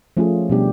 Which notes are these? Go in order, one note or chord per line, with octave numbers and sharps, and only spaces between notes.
F3 A3 C#4 F4 G#4
B2 G3 B3 D4 G4